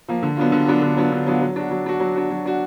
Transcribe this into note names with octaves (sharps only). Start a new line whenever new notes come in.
F3 A#3
D3
F#3 B3 D4 F4
D3
F#3 B3 D4 F4
D3
F#3 B3 D4 F4
D3
F#3 B3 D4 F4
F#3
D4 F#4
F#3
D4 F#4
F#3
D4 F#4
F#3
D4 F#4